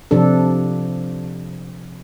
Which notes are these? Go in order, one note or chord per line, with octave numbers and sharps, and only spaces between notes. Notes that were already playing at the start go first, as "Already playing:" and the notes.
C3 F3 D4 A4